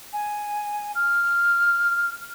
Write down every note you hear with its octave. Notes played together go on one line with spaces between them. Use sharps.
G#5
F6